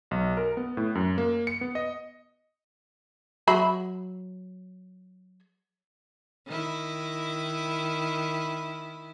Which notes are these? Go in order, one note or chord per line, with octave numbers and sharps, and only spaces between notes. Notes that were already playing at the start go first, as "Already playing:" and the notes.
B1
A#4
B3
A2
F#2
A#3
C#7
B3
D#5
F#3 E5 B5
D#3 E4